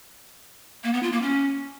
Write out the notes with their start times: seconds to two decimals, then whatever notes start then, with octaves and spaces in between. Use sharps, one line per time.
0.84 A#3
0.93 B3
1.03 F4
1.12 A#3
1.22 C#4